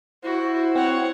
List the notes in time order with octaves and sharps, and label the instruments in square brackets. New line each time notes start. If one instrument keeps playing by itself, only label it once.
[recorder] E4 [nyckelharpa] F#4 [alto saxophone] C5
[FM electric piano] C4 [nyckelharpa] C#5 F#5